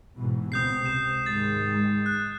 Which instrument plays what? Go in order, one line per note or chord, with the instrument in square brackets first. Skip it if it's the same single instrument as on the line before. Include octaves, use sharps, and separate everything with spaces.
[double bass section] G#2 B2 E3
[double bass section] C#2 B2 C4 [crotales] D#6 G6 C7
[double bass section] C3 [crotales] E7
[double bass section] G#2 D#3 G#3 [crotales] A6
[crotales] F#6